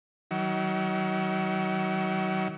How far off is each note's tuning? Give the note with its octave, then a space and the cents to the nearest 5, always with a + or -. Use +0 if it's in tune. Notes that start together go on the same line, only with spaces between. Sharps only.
D#3 +45 F#3 +35